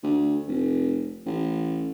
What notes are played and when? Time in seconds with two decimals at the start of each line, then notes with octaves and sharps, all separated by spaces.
0.03 D2
0.48 F1
1.26 A1